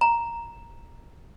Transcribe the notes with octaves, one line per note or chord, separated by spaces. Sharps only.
A#5